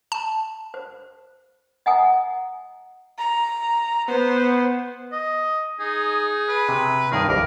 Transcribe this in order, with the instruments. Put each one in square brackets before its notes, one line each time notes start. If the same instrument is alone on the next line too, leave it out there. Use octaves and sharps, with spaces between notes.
[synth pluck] A5
[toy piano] C5
D#5 F#5 G#5 A#5 D#6
[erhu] A#5
[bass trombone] B3 [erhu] C5
[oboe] D#5
[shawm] D#4 [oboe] G#4
[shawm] B4
[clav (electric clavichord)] C3
[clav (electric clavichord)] G2 D#3 [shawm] G#4 [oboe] A#4
[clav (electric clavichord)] C2 F2 [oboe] A#4 [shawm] D6